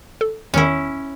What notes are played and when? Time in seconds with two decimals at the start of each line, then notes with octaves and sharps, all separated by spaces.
0.21 A4
0.54 E2 D#3 C#4 E4